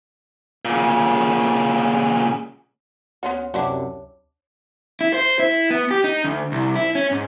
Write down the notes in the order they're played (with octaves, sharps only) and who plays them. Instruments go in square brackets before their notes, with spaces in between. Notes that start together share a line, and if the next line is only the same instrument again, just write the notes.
[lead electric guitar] A#2 C#3
[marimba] D2 C#5 C6 [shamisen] B3 C#4 F#4
[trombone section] F#2 C3 [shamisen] D4 E4 F#4 [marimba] C#5 A5 D6
[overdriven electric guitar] E4
C5
E4
B3
G4
D#4
D2
C2
E4
C#4
G#2